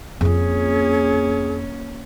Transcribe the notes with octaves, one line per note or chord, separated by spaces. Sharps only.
F2 A#3 C#4 F4 G#4